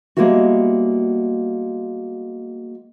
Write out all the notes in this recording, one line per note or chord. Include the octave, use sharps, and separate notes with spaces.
G3 G#3 A#3 B3 E4 F#4